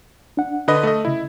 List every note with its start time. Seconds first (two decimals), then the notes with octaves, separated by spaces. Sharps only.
0.37 D4 F#5
0.68 D3 B4 D#5
0.83 A3 A4 D#5
1.05 C#3 E4 D#5